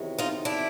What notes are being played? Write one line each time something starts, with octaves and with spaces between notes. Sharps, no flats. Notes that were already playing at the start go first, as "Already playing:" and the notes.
Already playing: E2 C3 D#3 F#3
D#4 F4
D4 E4